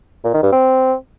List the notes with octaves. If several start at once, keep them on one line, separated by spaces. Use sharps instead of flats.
A#2
D#3
G2
C4